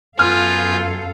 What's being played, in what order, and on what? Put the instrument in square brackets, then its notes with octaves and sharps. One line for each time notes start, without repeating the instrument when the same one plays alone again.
[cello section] F#2 A4 F5 [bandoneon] B3 G#5 G6 [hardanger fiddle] F4 [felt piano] F6